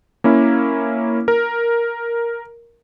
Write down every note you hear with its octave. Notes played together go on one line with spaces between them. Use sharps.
A#3 C#4 E4
A#4